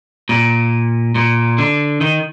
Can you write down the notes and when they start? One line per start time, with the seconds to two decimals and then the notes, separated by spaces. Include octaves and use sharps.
0.29 A#2
1.15 A#2
1.58 D3
2.01 D#3